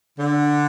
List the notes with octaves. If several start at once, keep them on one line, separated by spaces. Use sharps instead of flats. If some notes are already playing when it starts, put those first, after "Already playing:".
D3